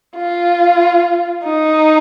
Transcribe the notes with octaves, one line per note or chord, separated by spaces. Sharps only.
F4
D#4